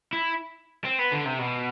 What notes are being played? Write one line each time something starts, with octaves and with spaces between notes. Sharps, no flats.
E4
C4
B3
D3
C3
B2